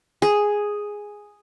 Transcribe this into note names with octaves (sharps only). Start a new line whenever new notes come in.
G#4